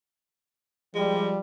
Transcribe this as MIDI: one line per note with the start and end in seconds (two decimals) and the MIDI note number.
0.95 1.39 53
0.95 1.39 55
0.95 1.32 56